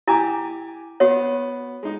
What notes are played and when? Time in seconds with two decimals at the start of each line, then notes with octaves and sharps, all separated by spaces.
0.07 E4 G4 G#5 A#5 D6
1.00 B3 F#4 C#5
1.83 G#3 D#4